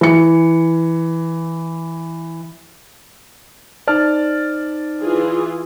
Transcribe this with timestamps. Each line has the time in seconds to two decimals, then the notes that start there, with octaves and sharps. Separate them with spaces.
0.01 E3 C#7
3.87 D#4 C5 D5 A5 F6
4.99 E3 F4 G#4